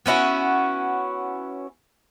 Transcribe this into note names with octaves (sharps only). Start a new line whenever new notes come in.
B3 C#4 E4 F#4